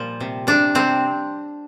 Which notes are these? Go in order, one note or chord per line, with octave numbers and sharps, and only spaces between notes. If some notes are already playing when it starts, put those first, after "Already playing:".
Already playing: A#2 F3 G3
C3
C3 D4
C3 C4